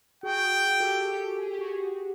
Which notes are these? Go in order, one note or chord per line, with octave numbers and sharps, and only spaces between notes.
F#4 G#4 G5
G4 A4
G4 A4
G#4
G4
F#4 G#4